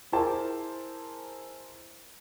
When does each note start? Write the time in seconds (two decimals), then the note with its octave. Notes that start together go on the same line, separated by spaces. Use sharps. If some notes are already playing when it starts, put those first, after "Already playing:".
0.12 E4 G#4 A#4 C5 A5 D6